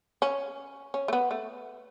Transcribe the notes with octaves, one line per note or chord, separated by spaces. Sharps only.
C#4
C#4
A3
B3
A3